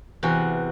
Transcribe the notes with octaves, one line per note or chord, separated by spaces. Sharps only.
E2 C3 E3 F#4